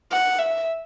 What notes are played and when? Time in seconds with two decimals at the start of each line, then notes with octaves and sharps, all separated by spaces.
0.11 F#5
0.39 E5